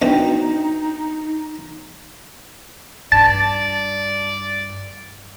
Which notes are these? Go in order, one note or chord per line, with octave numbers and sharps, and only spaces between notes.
A#1 B2 D4 D#4 F#4 G5
G2 D5 A5